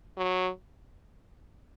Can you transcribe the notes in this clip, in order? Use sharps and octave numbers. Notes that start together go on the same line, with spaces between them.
F#3